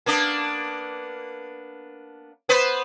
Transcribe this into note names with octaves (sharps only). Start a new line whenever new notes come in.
A#3 B3 D4
B3 B4 C5